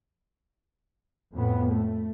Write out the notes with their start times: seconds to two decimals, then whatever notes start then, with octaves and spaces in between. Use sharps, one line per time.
1.34 F2 A2 B3
1.70 A3